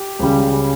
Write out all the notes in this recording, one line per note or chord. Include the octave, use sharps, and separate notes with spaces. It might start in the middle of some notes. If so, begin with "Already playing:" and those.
Already playing: G4
C#2 C#3 G3